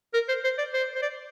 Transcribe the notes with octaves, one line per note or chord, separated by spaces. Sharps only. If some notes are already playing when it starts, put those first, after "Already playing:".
A#4
C5
C5
D5
C5
C5
D5